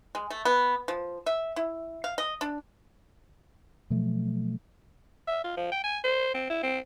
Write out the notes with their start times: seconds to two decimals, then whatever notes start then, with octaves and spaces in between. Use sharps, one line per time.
0.15 G#3
0.30 A3
0.45 B3
0.88 F3
1.26 E5
1.56 E4
2.04 F5
2.18 D#5
2.41 D4
3.90 B2 F3 F#3 A3
5.28 E5
5.44 F4
5.57 F3
5.72 G5
5.84 G#5
6.04 C5
6.34 C4
6.50 E4
6.63 C4